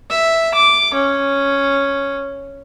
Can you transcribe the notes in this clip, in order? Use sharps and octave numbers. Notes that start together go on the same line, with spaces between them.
E5
D6
C#4